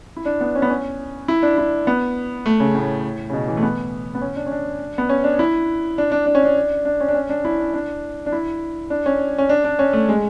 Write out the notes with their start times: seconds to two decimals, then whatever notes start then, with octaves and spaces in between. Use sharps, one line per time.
0.16 E4
0.26 D4
0.41 B3
0.55 C#4
0.62 B3
0.70 C#4
1.28 E4
1.43 D4
1.58 E4
1.87 B3
2.46 A3
2.60 C#3
2.75 A2
3.30 C#3
3.33 B2
3.48 E3
3.57 A3
3.63 B3
4.15 B3
4.21 C#4
4.36 D4
4.46 C#4
4.51 D4
4.98 B3
5.09 C#4
5.24 D4
5.39 E4
5.98 D4
6.12 D4
6.26 D4
6.35 C#4
6.44 D4
6.85 D4
7.00 C#4
7.08 D4
7.14 C#4
7.29 D4
7.45 E4
7.59 D4
7.74 D4
8.26 D4
8.32 E4
8.90 D4
9.06 C#4
9.38 C#4
9.49 D4
9.64 D4
9.79 C#4
9.93 A3
10.09 G#3